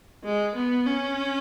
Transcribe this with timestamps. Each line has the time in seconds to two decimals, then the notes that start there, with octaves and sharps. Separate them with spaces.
0.24 G#3
0.55 B3
0.86 C#4